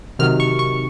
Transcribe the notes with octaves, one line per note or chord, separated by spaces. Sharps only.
C3 D#3 F#3 F6
C#6
C#6